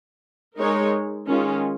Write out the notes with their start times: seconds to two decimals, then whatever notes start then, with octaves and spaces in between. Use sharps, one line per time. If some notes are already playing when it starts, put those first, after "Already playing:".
0.57 G#3 D#4 A#4 C#5
1.28 D#3 G#3 C#4 F4